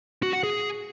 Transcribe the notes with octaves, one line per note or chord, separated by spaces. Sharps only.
F#4
F#5
G#4